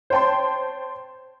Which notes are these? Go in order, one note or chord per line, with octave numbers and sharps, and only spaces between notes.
C5 C#5 G5 A5 C6